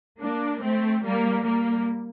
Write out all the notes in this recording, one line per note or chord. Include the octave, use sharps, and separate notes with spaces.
A#3 D4
A3 C4
G3 A#3
G3 A#3